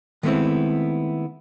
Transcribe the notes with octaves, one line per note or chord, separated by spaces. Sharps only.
D#3 G#3 A3 B3 C4 E4